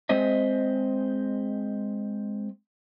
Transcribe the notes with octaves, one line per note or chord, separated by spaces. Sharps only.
G#3 C4 C5 D#5 E5